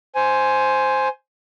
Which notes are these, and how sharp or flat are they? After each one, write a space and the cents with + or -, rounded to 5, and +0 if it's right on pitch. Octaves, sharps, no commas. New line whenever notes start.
C5 +0 G#5 +10